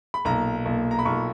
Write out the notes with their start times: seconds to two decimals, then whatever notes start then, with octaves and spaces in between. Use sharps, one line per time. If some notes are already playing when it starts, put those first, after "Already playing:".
0.14 B5
0.25 B1 A#2 A#5
0.66 B1 A#2
0.91 A#5
0.99 B5
1.05 B1 A#2 C#6